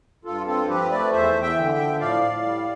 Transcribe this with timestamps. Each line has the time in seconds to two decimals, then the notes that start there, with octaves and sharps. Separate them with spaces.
0.25 G2 F4 A4
0.47 C4 F4 A4
0.69 F3 G4 B4
0.91 A3 B4 D5
1.12 E2 C5 E5
1.35 E2
1.42 E5 G5
1.57 D3
1.70 E5 G5
1.78 F3
2.00 A2 D5 F5
2.22 A2
2.44 G3